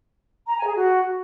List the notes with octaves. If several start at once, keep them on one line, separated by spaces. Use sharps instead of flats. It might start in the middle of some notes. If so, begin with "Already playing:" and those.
A#5
G#5
G#4
F#4